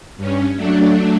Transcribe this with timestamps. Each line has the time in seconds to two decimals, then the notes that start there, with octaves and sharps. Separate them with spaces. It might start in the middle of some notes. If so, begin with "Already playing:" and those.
0.17 G2 C#4
0.56 F#3 A3 D4